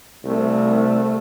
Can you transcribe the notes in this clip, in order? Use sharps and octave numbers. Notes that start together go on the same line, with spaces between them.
C2 A3